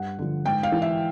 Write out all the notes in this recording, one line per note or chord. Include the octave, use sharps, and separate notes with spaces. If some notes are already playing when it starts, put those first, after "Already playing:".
Already playing: G2 F#5
D3 F3
G#2 G5
F5
E3
E5